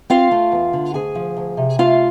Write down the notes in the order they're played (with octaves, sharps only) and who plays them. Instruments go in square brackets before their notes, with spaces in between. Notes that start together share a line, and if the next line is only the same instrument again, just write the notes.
[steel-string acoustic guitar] C4 F4 F5
A3
E2
D3
D2 G#4 G#5
F3
D2
C3
A3 F4 F5